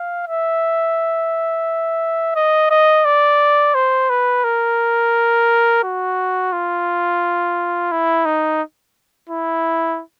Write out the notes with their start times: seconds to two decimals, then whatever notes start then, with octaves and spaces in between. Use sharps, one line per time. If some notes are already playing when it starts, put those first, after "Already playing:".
Already playing: F5
0.27 E5
2.35 D#5
2.70 D#5
3.05 D5
3.75 C5
4.10 B4
4.44 A#4
5.84 F#4
6.53 F4
7.92 E4
8.26 D#4
9.29 E4